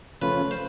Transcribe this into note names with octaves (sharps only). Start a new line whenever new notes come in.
C#3 F3 A3 C#4 F4 B4
C5